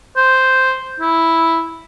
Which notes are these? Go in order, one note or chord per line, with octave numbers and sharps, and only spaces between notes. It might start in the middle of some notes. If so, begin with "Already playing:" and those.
C5
E4